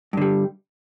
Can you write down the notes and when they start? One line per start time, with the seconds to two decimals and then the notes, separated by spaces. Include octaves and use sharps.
0.13 G2
0.17 D3
0.22 G3